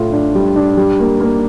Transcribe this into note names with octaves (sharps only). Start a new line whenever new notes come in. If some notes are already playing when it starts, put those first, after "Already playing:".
Already playing: A2 F4
D4
G3
D4
G3
A#3
A#3